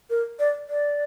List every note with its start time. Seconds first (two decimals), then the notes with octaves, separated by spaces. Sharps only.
0.10 A#4
0.39 D5
0.69 D5